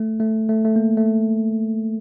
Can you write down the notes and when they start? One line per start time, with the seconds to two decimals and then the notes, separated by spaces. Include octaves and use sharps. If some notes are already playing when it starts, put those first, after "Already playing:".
Already playing: A3
0.20 A3
0.49 A3
0.65 A3
0.76 A#3
0.97 A3